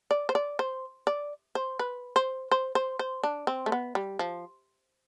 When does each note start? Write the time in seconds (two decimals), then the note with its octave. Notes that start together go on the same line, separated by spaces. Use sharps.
0.11 D5
0.29 C5
0.35 D5
0.59 C5
1.07 D5
1.55 C5
1.79 B4
2.16 C5
2.51 C5
2.75 C5
2.99 C5
3.24 D4
3.47 C4
3.66 A3
3.72 B3
3.95 G3
4.19 F3